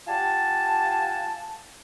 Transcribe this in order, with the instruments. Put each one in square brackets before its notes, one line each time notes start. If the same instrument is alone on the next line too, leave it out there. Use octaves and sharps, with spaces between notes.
[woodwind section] F4 G4 F#5 G#5 A5